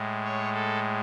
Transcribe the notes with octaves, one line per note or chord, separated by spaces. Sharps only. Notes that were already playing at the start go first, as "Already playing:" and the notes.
Already playing: A2 G#3
C#5
A4